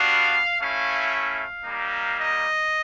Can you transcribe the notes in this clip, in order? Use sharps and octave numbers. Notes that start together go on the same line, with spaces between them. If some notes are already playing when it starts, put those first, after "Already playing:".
Already playing: G3 B3 D4 F#4 F5
A3 C#4 E4 F5
F5
G3 A#3 D#4
D#5